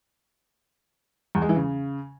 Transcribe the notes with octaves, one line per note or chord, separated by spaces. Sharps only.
E2
G#3
E3
C#3